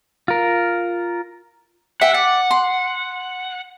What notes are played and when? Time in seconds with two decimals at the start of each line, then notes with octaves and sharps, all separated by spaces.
0.28 F4 A#4
2.01 E5 F#5 G5
2.14 D5 F#5
2.51 C6